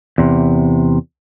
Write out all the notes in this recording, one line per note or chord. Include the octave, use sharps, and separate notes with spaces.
E2 C3